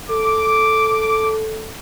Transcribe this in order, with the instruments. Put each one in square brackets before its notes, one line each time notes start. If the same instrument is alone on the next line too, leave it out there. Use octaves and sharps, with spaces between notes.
[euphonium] A4 [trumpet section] D6